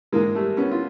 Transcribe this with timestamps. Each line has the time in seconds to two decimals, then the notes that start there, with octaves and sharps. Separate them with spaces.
0.12 G#2 E3 G#3 A#3
0.35 G3 A3
0.57 B3 C#4
0.71 F4